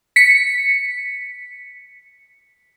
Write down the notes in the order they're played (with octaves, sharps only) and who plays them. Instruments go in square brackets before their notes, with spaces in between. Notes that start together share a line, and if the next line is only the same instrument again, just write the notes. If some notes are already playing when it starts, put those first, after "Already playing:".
[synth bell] B6 C#7